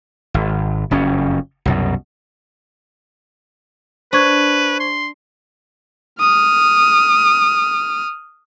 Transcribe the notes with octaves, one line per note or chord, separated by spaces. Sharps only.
G#1
F#1 F2 C#4
C2 F#2 B2
D4 B4 C5 C#6 G#6
C6
D#6 F6